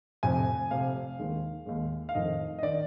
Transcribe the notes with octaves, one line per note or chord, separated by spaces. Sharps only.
F1 F2 C3 G#5
F1 F2 C3 F5
D#2 D#3 G#3
D#2 D#3 G#3
F5
F1 F2 D#3 D#5
D#5
D#3 D5